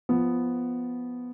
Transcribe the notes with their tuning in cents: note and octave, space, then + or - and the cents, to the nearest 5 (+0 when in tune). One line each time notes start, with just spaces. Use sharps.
F3 -5 B3 +0